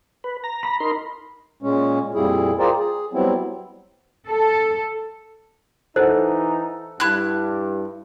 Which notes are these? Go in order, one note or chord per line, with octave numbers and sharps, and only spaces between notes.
B4
A#5
B5
D#4 A#4 C6
A#2 G#3 C#4
F2 A#2 G3 E4 G#4
F4 G#4 A#4 C5 D5 G5
G#4
F#3 G3 B3 C4 E4
A4
E3 D#4 A4 C5 F#5
G2 E4 F#6